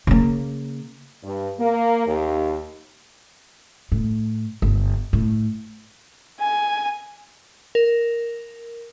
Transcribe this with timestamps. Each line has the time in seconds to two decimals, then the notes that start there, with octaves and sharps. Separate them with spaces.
0.07 C#3 A#3
1.23 G2
1.60 A#3
2.07 D#2
3.92 A2
4.62 G1
5.13 A2
6.40 G#5
7.75 A#4